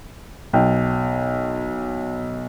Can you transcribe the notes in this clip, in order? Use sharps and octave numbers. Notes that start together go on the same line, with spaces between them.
B1 G5